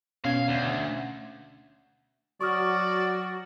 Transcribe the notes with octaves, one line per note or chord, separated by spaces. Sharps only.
B2 C#4 F5 G#6
D2
F#3 F#4 D5 C#6 D#6 F6